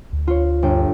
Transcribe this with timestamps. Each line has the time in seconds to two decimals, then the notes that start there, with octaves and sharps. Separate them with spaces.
0.13 D2
0.27 F4 C#5
0.62 G1 G5